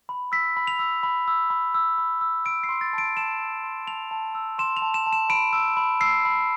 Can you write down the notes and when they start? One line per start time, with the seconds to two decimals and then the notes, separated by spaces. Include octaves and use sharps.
0.09 B5
0.32 E6 B6
0.57 B5
0.67 F7
0.79 E6
1.03 B5
1.28 E6
1.50 B5
1.74 E6
1.98 B5
2.21 E6
2.45 E6 D7
2.63 C7
2.69 C6
2.81 A6
2.93 A5 D7
3.17 A5 E7
3.40 E6
3.63 C6
3.87 A5 F7
4.11 A5
4.35 E6
4.59 C6 E7
4.77 F7
4.82 A5
4.94 E7
5.07 A5
5.13 E7
5.29 B5 D7
5.53 E6
5.77 B5
6.01 E6 C7
6.25 B5